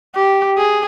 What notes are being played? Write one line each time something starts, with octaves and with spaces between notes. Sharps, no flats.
G4
G#4